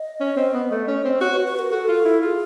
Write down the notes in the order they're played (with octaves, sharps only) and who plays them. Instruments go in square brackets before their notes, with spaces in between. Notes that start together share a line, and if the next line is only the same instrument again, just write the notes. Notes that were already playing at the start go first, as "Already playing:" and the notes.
Already playing: [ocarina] D#5
[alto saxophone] C#4
C4
B3
A3
C#4
C4
[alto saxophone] F#4 [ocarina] C#5
[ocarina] B4
[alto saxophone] F#4
[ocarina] B4
[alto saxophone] F#4 [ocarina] A#4
[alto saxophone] F#4 [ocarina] A4
[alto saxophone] F4
E4
[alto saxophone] F4 [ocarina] G#4 A4